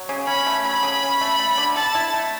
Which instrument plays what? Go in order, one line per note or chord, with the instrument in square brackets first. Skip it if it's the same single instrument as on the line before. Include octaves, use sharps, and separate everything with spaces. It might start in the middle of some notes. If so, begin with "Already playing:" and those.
Already playing: [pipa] F#3
C#3
[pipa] C#4 [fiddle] B5
[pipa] A3
[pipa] F#3 [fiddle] B5
[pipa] C#3
C#4
A3
A3
D3
[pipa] A4 [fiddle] A5
[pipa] E4
A3